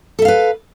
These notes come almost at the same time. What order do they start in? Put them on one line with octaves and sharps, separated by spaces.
A4 E5 F5 B4